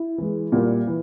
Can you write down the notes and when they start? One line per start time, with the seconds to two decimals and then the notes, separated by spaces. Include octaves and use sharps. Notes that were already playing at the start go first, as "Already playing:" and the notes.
Already playing: E4
0.18 E3 G#3
0.52 A#2 G3 A#3
0.87 E3